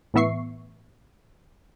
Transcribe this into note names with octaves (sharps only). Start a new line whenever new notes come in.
A2 E3 B3 E5 C#6 C7